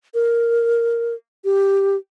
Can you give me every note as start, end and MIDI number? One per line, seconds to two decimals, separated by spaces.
0.14 1.15 70
1.44 1.96 67